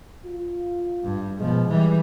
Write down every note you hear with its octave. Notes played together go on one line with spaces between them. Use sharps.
F4
G2
B2 F3 G#3
E3 G3